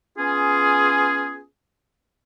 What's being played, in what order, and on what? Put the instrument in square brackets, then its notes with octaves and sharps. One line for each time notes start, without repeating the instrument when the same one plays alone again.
[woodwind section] B3 C#4 F4 G#4